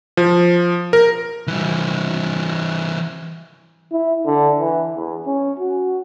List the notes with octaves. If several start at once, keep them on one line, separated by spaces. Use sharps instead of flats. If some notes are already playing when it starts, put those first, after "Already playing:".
F3
A#4
E3 G3
E4
D3
E3
E2
C#4
F#4